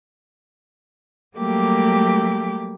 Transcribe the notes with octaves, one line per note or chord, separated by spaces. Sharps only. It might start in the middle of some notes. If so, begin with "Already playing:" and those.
F#3 G3 A3 A#3 G4 D6